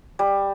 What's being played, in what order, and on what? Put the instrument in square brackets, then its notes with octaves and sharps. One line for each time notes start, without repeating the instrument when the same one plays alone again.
[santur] G3